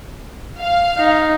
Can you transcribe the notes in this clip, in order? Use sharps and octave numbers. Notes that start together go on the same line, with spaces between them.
F5
D#4